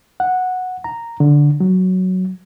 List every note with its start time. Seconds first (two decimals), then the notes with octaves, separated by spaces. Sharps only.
0.20 F#5
0.84 A#5
1.20 D3
1.60 F#3